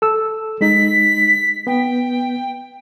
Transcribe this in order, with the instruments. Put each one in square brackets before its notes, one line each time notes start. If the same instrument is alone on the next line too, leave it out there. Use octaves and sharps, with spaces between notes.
[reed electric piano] A4 E6
[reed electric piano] G#3 D#4 [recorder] B6
[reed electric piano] B3 [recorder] G5